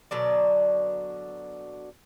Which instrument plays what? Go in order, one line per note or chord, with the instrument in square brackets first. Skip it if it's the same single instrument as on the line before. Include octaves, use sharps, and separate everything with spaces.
[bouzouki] B2 D3 F#3 D5